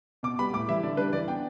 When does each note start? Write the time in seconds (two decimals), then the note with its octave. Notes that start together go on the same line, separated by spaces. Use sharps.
0.23 B2 D6
0.39 G3 B3 B5
0.53 A2 D6
0.68 E3 G3 E5
0.83 D3 D5
0.97 G3 D4 B4
1.13 E3 D5
1.28 B3 D4 G5